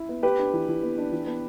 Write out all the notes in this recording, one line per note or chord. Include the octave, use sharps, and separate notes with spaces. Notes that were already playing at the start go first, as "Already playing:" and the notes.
Already playing: E4
B3
B3 G4 B4
D4
E3
E3
B3
D4
E3
B3